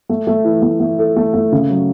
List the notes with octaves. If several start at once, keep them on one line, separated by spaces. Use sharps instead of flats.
A3
A3
E3
A3
A3
A4
A3
A3
C#3
F#3